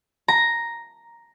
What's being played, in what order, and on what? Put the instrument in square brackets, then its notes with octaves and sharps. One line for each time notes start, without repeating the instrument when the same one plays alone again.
[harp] A#5